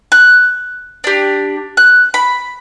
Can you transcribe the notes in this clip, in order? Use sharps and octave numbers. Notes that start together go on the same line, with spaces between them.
F#6
D4 G4
F#6
B5